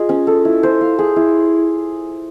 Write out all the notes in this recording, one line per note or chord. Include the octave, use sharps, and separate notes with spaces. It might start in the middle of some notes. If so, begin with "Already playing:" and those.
Already playing: F4 G#4 D#5
C#4
A4
E4
C5
F5
G#4
E4